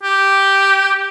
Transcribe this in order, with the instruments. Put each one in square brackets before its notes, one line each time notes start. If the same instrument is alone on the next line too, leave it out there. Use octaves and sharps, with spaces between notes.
[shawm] G4